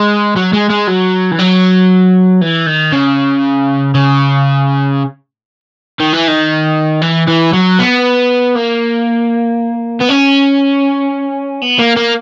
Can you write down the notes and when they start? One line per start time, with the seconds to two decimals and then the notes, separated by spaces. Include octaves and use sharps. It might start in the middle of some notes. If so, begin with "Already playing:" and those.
Already playing: G#3
0.36 F#3
0.53 G#3
0.70 G#3
0.88 F#3
1.32 E3
1.39 F#3
2.41 E3
2.67 D#3
2.93 C#3
3.95 C#3
6.00 D#3
6.13 E3
6.28 D#3
7.02 E3
7.27 E3
7.53 F#3
7.79 B3
8.56 A#3
10.00 B3
10.09 C#4
11.62 B3
11.79 A#3
11.97 A#3